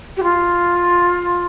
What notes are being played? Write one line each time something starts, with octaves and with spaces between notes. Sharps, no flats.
G4
F4